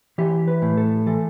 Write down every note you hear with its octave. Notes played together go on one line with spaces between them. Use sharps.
E3 G4
B4
A2
A4
E3 A4